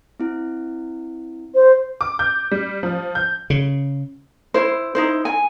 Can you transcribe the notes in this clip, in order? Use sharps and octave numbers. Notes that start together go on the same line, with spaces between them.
C4 E4
C5
D6
G6
G3
F3
G6
C#3
E4 C5
D#4 E4 C5
G#5